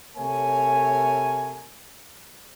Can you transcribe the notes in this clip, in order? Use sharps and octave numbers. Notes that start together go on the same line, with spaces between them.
C3 A3 A#4 C#5 G#5